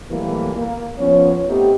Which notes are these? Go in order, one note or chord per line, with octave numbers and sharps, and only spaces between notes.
B2 E3 F#3 G3 A3 A#3
A#3
F3 B3 C#4 C#5
A3 B3 C4 D#4 G4